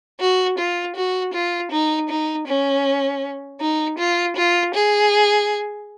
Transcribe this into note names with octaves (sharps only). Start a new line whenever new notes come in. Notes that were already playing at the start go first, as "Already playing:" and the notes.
F#4
F4
F#4
F4
D#4
D#4
C#4
D#4
F4
F4
G#4